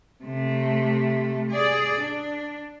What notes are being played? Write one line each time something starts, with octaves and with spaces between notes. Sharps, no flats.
C3 A3
G#4 D5
D4